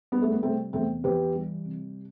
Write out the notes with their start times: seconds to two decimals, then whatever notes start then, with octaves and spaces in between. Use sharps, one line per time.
0.12 G3 B3
0.22 A3
0.32 B3
0.43 C3 A3 C4
0.73 E2 A3 C4
1.04 E3 G4 B4
1.35 G3
1.65 C3